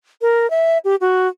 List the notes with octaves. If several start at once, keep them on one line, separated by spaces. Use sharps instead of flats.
A#4
E5
G4
F#4